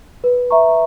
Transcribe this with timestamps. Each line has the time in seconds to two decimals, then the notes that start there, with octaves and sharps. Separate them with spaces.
0.24 B4
0.51 E5 A#5 C#6